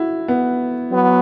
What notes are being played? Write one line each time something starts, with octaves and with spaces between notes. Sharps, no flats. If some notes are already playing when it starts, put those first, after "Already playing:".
Already playing: E4 F#4
B3
F#3 B3